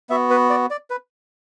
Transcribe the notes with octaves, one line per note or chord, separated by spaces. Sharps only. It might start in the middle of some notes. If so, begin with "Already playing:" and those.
B3 F#4 E5
B4
D5
D5
B4